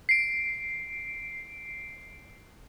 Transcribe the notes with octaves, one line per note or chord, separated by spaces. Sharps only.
C7 D7